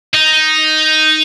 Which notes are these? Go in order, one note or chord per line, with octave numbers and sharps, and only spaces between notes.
D#4